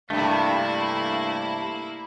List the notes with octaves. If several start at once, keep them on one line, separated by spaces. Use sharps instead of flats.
G2 C3 A3 A#3 E4